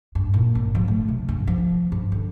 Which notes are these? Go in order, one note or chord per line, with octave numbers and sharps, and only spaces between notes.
G2
A#2
G#1
F3
A3
C3
G2
F3
G2
D3